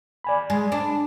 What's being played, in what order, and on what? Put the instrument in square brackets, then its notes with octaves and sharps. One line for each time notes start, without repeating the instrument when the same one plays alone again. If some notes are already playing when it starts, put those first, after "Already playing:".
[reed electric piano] D5 G#5 B5
[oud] G#3
D4